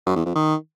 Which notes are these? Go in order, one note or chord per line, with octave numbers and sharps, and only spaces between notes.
F#2
E2
F2
D#3